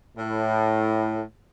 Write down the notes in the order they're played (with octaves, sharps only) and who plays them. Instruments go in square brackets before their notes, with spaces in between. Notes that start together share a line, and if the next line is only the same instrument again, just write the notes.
[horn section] A2